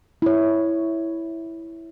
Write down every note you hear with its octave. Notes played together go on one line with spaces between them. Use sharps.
E4 C#5